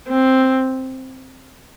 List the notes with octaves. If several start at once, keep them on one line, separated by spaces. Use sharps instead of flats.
C4